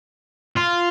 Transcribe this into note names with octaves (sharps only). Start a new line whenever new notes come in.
F4